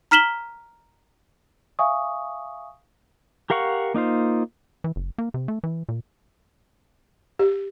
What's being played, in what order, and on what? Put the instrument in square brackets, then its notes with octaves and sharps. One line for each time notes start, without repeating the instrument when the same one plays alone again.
[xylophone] A#5 F6 B6 E7 F#7 G7
[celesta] E5 F5 G#5 C#6 D#6
[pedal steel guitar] G4 A#4 F5 F#5 C#6
A#3 D#4 F4 C5
[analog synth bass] E3
F#1
A#3
C3
A3
E3
A#2
[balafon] G4